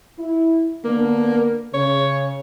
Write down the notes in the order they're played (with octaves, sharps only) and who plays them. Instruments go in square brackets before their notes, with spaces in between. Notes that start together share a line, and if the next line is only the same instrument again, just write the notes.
[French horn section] E4
[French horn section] D3 B3 D4 [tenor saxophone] A#3
[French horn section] C#3 [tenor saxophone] C#5